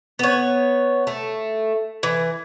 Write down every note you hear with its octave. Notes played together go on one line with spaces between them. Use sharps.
B3 C#5
A3
E3